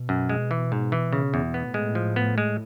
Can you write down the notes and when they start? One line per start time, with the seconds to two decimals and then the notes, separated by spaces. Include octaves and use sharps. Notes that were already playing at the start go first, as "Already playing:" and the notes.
Already playing: B2
0.09 F#2
0.29 G#3
0.51 E3
0.72 G#2
0.92 E3
1.13 C#3
1.34 E2
1.54 A2 B3
1.74 G#3
1.95 F3
2.16 B3
2.38 G#3